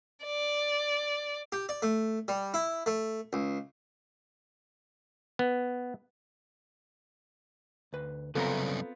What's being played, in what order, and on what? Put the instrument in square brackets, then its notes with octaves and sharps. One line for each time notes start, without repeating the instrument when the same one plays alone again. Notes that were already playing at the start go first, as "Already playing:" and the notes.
[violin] D5
[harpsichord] G4
D5
A3
G3
E4
A3
C#2
[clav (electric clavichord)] B3
[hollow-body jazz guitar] D2 B4
[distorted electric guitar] C2 F#2 [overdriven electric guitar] C#3 [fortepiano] B3 C4 F4 [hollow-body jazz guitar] A4 A#5